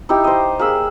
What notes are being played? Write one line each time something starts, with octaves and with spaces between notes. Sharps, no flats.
D#4 E4 G4
C5 D#5
A#3 G#4 B5 E6